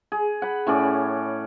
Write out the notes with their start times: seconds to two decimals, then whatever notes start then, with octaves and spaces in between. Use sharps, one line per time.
0.12 G#4
0.42 F#5 B5
0.67 A2 C#4 A4 D5